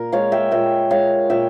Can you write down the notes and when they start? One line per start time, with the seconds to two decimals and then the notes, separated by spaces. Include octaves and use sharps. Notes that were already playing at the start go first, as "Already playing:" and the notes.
Already playing: A#2 A#4
0.12 G#3 C#5 F5
0.32 E5 G5
0.51 A#2 E5 G5
0.90 G#3 C#5 F5
1.29 A#2 E5 G5